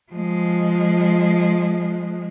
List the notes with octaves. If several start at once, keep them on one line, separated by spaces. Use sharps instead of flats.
F3 G#3